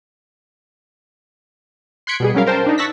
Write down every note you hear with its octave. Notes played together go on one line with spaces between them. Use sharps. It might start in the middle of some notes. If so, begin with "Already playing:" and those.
C6 F#6 G#6 B6 C#7 D7
B2 G3 G#4
F#3 G3 C#4 A#4 F5
A#4 C5 G5 A5
D4 D#4
A5 C#6 E6 F#6 A#6 B6